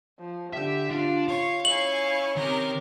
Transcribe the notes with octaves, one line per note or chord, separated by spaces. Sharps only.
F3
D3 G4 E5
D4 F4
C#5 F5
C#4 E4 G#5 C#6 F#7
C3 D#3 G4 A#4